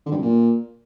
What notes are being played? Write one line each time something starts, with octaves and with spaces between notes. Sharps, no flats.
D3
G2
F#2
A#2